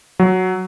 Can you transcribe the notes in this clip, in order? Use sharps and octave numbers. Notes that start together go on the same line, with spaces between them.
F#3